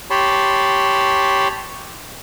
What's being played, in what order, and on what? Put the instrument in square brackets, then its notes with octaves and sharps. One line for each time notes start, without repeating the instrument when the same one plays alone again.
[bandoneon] G4 C#5 A5 B5 C6